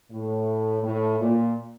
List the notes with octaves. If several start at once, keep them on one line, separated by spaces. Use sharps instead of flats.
A2
A2
A#2